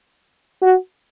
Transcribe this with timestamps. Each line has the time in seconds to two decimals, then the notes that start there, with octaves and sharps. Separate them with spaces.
0.62 F#4